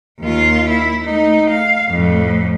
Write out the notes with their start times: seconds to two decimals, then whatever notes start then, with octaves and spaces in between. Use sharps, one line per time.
0.20 D#2 F4
0.69 E4
1.05 A3 D#4
1.50 F5
1.90 F2 A2